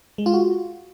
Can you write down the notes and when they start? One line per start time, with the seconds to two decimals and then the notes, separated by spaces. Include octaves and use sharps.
0.18 G#3
0.26 F4
0.34 F#4